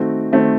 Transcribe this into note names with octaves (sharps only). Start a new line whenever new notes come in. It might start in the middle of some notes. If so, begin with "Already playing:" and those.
Already playing: D#3 A3 C4 F#4
D#3 A3 C4 F#4